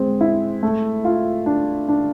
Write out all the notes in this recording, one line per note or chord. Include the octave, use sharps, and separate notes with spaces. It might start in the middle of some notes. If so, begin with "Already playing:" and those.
Already playing: G#3 C4
E4
A3
F4
D4
D4